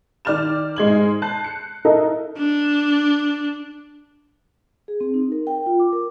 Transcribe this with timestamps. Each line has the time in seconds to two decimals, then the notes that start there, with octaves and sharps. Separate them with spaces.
0.25 D#3 D5 F6 A6 E7
0.76 G#2 G#3 G#6 F#7
1.22 A5 F#6 G6 C7
1.44 C#7
1.85 D#4 E4 A4 A#4 D#5
2.38 D4
4.88 G#4
5.01 C4
5.14 D#4
5.32 A#4
5.47 G5
5.66 F4
5.80 D6
5.92 A#4